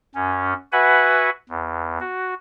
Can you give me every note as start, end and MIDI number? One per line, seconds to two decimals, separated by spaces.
0.15 0.54 42
0.15 0.54 61
0.72 1.30 66
0.72 1.30 71
0.72 1.30 76
0.72 1.30 78
0.72 1.30 80
0.72 1.30 83
1.49 1.98 40
2.00 2.34 66